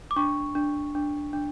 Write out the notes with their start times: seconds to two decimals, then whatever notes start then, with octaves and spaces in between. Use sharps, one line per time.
0.11 D6
0.16 D4 C#6
0.55 D4
0.95 D4
1.33 D4